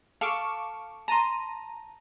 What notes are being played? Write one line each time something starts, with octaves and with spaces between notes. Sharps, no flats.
A4 F5 C#6 D6
A5 A#5 C6 D#7